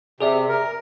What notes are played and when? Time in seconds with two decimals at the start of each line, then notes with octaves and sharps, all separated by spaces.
0.21 C3 G#4 D5 E5
0.49 A#4